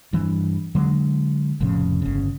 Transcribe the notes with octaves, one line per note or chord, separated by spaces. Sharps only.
G2 E3
D3 F#3 G#3
F1 F2 A2 C#3
G1 C#3